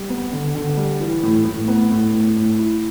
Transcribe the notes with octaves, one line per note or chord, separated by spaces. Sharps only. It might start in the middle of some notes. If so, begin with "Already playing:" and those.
Already playing: G3
B3
D3
D3
G3
E3
A2
A2
B3
A2
A2
A2
E4